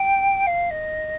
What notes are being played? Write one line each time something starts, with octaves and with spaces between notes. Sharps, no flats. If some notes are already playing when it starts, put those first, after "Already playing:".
Already playing: G5
F5
D#5